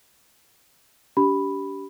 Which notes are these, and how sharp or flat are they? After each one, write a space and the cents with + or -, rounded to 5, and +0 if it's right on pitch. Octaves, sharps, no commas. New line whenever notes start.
D4 -40 G4 -20 B5 +0